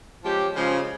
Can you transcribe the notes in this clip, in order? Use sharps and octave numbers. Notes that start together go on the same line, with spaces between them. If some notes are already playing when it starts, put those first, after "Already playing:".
F3 G#3 C#4 G4
C#3 F3 G#3